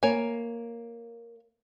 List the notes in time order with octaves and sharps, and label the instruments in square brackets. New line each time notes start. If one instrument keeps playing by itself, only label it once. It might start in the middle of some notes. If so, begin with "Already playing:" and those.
[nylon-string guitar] A#3 [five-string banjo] C#5 G#5